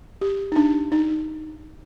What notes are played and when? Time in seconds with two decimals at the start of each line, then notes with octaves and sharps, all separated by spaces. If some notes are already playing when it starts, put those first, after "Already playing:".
0.21 G4
0.52 D#4
0.56 D4
0.92 D#4